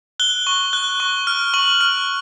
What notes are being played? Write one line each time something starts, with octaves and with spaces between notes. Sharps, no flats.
F#6 G7
C#6
F#6
C#6
F6
C#6 F#7
F6